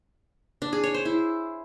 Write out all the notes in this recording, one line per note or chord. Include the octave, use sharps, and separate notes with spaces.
D4
G#4
C#5
C5
E4